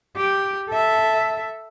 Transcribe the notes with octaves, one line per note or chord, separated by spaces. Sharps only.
G4
A4 E5